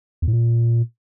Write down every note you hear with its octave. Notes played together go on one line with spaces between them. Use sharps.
E2
A2
A#2